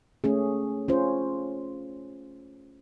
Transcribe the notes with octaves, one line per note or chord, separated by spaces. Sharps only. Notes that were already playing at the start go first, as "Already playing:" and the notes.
A3 C#4 G#4
C#4 F4 C5